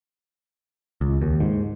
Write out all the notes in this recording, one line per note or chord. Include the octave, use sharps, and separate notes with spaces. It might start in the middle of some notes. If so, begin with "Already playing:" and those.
C#2
D#2
G#2